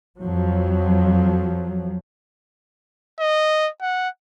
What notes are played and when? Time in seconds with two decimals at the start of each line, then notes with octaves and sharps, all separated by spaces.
0.20 F2 F3 F#3
3.20 D#5
3.81 F#5